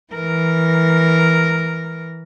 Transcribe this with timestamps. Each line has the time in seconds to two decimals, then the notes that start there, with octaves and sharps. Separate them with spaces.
0.13 E3 A#4